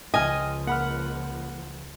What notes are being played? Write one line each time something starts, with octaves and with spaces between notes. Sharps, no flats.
C#2 F3 D#5 G5 G#5 F6
A#3 F#5 B5 F6